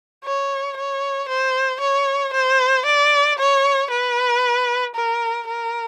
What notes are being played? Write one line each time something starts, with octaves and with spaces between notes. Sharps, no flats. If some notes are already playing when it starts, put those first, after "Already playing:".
C#5
C#5
C5
C#5
C5
D5
C#5
B4
A#4
A#4